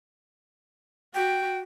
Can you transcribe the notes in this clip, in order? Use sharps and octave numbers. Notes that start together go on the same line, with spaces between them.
F#4 G5